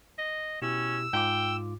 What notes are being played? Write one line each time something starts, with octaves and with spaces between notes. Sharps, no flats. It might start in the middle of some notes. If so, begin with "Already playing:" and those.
D#5
B2 C#4 E4 G4 E6
G#2 F4 G5 D6